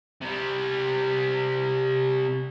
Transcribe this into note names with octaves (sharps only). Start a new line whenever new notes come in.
C3 G3